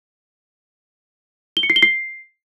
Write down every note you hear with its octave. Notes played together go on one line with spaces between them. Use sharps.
G7
C#7
C7
G7
C7